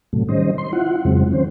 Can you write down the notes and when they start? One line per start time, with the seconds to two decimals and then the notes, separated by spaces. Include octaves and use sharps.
0.13 A2 C3 F#3 A3
0.29 D#3 G3 C#4 C5 D#5
0.58 C6
0.73 E4 F4 F#5
1.05 F2 C#3 F#3 G#3 C4
1.33 D#3 C4 C#4 C5